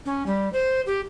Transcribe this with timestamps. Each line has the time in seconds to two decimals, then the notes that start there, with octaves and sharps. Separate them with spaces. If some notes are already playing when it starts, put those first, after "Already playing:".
0.06 C#4
0.26 G3
0.53 C5
0.86 G4